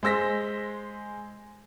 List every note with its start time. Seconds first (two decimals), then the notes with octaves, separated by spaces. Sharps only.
0.03 G#3 C5 E6 A#6 B6